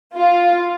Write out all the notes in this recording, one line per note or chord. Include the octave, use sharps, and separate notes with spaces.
F4